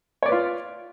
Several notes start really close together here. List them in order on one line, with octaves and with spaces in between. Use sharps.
C#5 D5 B4 F4